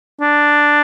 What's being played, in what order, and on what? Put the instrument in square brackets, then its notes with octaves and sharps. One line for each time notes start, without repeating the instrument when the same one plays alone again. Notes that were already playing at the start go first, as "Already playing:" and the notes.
[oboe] D4